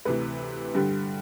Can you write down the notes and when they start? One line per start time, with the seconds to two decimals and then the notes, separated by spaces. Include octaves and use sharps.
0.05 D2 C3 E3 B4
0.75 G2 D3 G3 G4